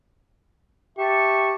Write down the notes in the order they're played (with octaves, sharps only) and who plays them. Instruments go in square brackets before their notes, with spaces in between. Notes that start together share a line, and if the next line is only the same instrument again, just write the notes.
[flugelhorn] G4 [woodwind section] E5 A5 C#6